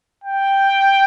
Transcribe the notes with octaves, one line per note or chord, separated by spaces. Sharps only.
G5